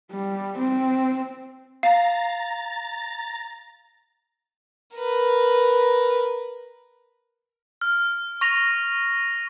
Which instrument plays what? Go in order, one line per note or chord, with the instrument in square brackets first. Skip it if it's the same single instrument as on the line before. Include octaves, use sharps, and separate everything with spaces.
[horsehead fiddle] G3
C4
[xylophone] F5 [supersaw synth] A#5 A6
[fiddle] A#4 B4
[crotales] F6
C#6 A#6 F7